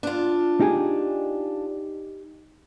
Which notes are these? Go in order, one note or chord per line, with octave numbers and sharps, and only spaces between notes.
D4 F4
D#4 G4 G#4